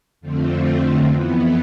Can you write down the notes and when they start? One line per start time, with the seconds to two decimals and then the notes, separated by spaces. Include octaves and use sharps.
0.21 F2 D3 F3 A3 C4
1.06 F2 E3 B3